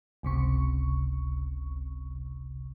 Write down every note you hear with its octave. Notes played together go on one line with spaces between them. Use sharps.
G1 C#2 C3 C#6